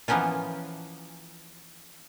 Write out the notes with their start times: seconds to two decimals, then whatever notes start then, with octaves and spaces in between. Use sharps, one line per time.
0.08 E3 F3 A#3 B3 C#4 F4